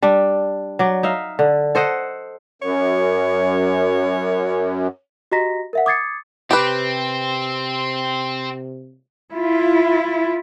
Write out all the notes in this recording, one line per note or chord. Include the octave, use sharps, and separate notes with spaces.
G3 D4
F#3 D5
D#4 E5 F5
D3
A4 C5 D#5 F#5
F#2 C#5
F#4 G4 D#5 A#5 A#6 B6
A#4 E5 F#5
D6 D#6 G#6 A6 C7 C#7
C3 C4 G4 B4
E4 F4